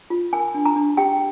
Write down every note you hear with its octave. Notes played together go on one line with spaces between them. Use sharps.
F4
A#4 G#5
D4
A#5
D4
G4 G5